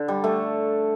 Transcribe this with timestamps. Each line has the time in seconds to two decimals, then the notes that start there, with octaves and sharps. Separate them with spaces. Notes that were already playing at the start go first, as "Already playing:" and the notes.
Already playing: D3
0.08 G3
0.24 A3